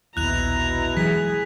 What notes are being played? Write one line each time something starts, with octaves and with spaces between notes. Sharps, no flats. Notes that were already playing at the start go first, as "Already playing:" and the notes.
A#1 D#2 B2 E4 A#5 F#6 F7
E3 F#3 G#3 G#4 B6